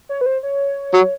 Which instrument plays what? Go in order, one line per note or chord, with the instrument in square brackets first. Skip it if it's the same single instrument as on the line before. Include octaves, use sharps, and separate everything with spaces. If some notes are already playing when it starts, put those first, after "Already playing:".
[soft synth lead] C#5
B4
C5
C#5
[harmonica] F#3